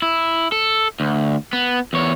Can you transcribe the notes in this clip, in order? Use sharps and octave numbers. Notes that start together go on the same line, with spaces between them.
E4
A4
D2
B3
E2 C#5